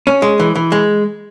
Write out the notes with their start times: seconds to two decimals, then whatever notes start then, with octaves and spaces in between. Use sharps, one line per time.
0.07 C#4
0.22 G#3
0.40 E3
0.55 E3
0.72 G#3